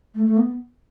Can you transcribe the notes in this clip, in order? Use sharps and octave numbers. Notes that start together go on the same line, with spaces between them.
A3
A3
B3